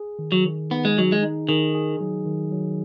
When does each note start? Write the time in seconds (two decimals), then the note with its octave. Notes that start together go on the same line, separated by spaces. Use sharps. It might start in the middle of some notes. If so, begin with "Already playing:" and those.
Already playing: G#4
0.19 D#3
0.32 F#3
0.45 D#3
0.71 B3 D#4
0.85 G#3
0.97 F#3 G#4
1.12 G#3
1.23 D#4
1.48 D#3 G#4
1.75 G#4
2.01 F#3
2.26 D#3
2.52 F#3